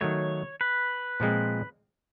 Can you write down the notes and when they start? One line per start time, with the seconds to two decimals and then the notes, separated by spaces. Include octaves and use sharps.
0.01 D#3 F#3 A3 C#5
0.61 B4
1.20 A#2 F3 G#3 C4